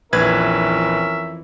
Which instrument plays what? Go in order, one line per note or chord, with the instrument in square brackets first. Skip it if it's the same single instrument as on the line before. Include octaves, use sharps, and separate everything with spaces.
[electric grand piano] A#1 B4 G#6 [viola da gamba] F2 E3 [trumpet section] C#4 A#4 E5